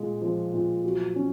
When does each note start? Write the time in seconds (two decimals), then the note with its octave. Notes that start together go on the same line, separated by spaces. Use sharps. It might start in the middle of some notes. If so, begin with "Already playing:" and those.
Already playing: A#2 G#3
0.21 F3
0.53 A#2
0.84 F#3
1.16 C#4